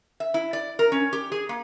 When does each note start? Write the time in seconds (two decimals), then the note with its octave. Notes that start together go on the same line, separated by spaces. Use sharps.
0.20 E5
0.34 E4
0.53 D5
0.79 A#4
0.92 C#4
1.13 G4
1.32 G#4
1.49 A#3